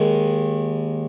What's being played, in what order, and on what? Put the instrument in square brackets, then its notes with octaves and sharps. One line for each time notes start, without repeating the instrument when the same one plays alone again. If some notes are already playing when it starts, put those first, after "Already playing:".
Already playing: [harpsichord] D#2 D#3 G#3